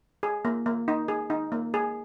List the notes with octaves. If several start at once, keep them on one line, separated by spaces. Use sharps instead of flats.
G#4
A#3
A#3
D#4
G#4
D#4
A#3
G#4